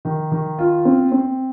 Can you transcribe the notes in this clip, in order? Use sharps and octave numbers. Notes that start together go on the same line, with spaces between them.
D#3
D#3
F4
C4
C4